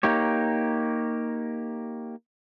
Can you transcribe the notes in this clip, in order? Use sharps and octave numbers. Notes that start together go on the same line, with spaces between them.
A#3 D#4 G4 C#5